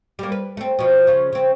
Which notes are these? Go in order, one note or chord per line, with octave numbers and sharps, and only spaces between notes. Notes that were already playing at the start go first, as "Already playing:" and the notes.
G3 A#3
B4
A3 C4
B2 F3
C#3 F4
C#3 C4